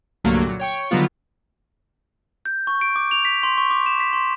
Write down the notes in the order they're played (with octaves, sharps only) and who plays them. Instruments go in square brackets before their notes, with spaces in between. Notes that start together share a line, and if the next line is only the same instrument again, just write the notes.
[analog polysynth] C2 G2 D3 F#3 A3 A#3
A#2 F#3
C#5 G5 C#6
D3 D#3 F#3 G3 B3 F4
[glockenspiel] G6
C#6
D7
D6
F7
B6
C6
C#6
D6
E7
B6
C6